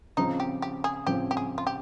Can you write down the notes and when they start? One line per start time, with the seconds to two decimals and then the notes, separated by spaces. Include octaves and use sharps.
0.17 C#3 F3 C4 D#4
0.40 G4
0.62 G4
0.84 G#4
1.07 C#3 F3 C4 G4
1.31 G4
1.37 G#4
1.58 F4
1.67 G4